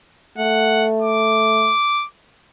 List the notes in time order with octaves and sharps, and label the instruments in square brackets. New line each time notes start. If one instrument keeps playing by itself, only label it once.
[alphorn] A3 [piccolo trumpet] F#5
[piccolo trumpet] D6